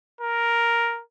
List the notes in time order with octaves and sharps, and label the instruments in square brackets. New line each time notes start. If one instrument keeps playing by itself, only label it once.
[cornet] A#4